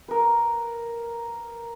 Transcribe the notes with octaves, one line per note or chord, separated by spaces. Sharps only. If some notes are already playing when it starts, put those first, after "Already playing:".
A#4 B4